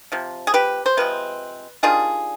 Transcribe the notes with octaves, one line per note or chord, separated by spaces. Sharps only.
C3 F3
G#4
G4 B4
C5
C3 F3 G#3 C4 B4
D#3 G3 D4 F4 G#4